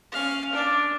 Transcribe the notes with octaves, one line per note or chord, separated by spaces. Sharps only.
C#4 F5
D4 D5